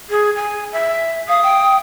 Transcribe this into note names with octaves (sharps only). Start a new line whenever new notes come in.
G#4
G#5
E5
F5 D#6
G5